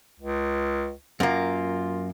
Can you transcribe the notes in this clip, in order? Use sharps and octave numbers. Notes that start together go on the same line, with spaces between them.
C#2
F#2 A#3 F4